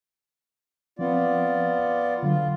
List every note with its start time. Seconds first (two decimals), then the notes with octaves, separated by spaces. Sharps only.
0.99 F3 B3 C4 F4 D5
2.23 D3 F#3 F4